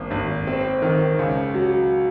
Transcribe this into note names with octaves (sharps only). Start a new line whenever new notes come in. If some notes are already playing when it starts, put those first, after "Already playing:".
Already playing: G#1 A#3
G#1
C4
D#3
C#2
F#3